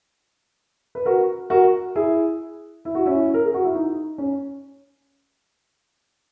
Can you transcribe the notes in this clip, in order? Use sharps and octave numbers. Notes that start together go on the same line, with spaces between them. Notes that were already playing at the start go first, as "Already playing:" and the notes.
B4
F#4 A#4
F#4 A#4
E4 G#4
E4
F#4
C#4 E4
A#4
G#4
F#4
E4
D#4
C#4